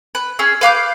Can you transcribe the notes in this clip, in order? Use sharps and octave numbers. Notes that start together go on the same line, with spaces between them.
B4
C#4 G#4 E6
B4 F5 D6 G6